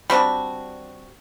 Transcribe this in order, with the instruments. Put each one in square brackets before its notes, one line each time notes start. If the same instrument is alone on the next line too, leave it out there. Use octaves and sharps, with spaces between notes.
[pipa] G3 C4 D4 F#4